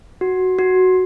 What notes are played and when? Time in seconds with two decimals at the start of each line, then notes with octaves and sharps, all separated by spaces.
0.21 F#4
0.59 F#4